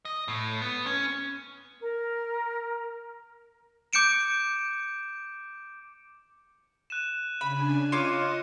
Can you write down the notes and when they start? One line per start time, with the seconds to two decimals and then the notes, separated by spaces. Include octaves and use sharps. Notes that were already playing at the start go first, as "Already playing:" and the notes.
0.05 D#5
0.28 A2
0.62 B3
0.87 C#4
1.82 A#4
3.93 D6 G6 C#7 D7 E7
6.90 F#6 D#7 E7
7.41 C#3 D4 G#5 B5
7.92 F4 C#5 D#5 D6 C#7 D#7